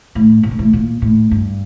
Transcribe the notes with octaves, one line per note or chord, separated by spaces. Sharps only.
A2
A2
G2
A2
A#2
A2
G2